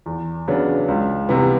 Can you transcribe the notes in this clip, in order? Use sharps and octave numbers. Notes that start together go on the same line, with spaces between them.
E2
C#3 F#3 B3 D4
C#2
C3 E3 G3 B3